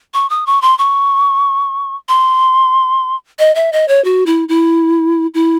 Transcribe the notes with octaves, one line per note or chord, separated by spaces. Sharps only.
C#6
D#6
C#6
C6
C#6
C6
D#5
E5
D#5
C#5
F#4
E4
E4
E4